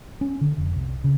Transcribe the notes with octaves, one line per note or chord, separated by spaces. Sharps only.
C#4
D3
F1
C2
C#3